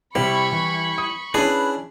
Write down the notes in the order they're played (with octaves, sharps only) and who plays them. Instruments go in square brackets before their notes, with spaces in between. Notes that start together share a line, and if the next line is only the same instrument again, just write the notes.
[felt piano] C3 C5 [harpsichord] G3 [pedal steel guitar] E4 [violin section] B5 C#6
[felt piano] E3
D#6
[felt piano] C#4 E4 [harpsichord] D4 G#4 [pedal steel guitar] B4